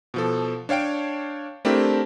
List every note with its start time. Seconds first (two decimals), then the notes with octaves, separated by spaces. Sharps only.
0.14 B2 F3 A4
0.69 D4 C#5 F5 G5 D7
1.65 A3 C4 D4 E4 G4 A#4